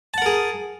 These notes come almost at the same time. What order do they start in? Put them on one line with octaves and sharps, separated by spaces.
A5 F#5 A#4 G#4